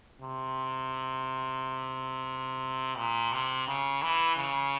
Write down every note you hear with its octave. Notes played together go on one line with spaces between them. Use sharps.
C3
A#2
C3
C#3
E3
C#3